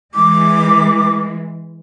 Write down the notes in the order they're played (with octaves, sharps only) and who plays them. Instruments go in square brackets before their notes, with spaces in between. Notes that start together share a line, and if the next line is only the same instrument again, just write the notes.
[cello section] E3 G#3 [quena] D6